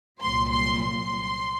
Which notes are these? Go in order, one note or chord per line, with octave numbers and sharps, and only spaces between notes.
C2 A#2 F#3 C6
C6
C6